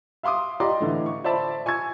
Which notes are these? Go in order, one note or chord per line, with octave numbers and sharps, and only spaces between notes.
E5 F5 C6 D6 D#6
G4 D5 D#5 A#5 C6 D6
A2 D3 E3
C#6
C5 D5 E5 A5 B5
G#5 C#6 E6 G#6